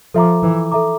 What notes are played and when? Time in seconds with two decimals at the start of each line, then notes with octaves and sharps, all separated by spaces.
0.14 F3 A4 E5 A#5 D6
0.43 E3
0.72 A4 E5 A#5 D6